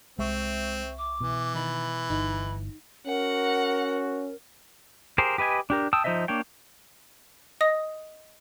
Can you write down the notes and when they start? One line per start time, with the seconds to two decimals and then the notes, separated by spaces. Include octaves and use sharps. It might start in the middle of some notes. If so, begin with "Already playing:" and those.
0.19 C2 G#3 C4 E5 C#6
0.98 D6
1.21 B2 E3
1.54 D#3 D#4 B5 A6
2.10 G1 D#4
3.06 C#4 F#4 A#4 F#5
5.18 G4 G#4 A#4 C5
5.38 G4 B4 D#5 G#5
5.70 D4 G4 A#4
5.93 G5 A5 D#6 E6
6.04 F3 D#4 C5 D#5 E5
6.28 A#3 D4 C#5 G5
7.61 D#5 D#6 A#6